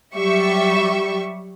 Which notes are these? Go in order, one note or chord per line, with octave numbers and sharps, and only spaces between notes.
F#3 G3 G4 E5 C#6